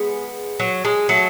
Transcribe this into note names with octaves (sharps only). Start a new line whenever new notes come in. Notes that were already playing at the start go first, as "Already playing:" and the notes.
Already playing: G#3 B3 G#4
F#3
G#3
F#3 A3